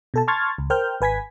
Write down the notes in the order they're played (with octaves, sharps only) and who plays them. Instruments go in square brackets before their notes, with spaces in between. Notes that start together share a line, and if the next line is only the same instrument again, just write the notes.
[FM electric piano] B2 A4 A5
A5 C6 C#6 F6 G#6 A6
C#2
A#4 C5 G5 F6 G6
G#1 B4 G#5 G#6 B6